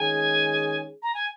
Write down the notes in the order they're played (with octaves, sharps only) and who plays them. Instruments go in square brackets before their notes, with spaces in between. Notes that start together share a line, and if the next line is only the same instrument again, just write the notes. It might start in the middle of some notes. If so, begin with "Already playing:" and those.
Already playing: [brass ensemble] D#3 G#3 C#4 G#4 [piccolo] G#5
[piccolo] A#5
G#5